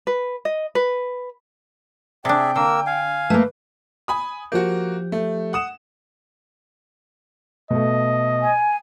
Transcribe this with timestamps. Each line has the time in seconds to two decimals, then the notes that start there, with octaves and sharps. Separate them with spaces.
0.07 B4
0.45 D#5
0.75 B4
2.25 C3 D4 G#4 D5 E5 G5
2.56 D3 A#3 A#4 E6
2.86 F5 G#5
3.30 A3 A#3 B4
4.08 G#5 B5 D#6
4.52 F3 A#3 F#4 G4 G6
5.12 A3
5.53 F#5 D#6 E7
7.70 B2 A3 D#5
8.42 G#5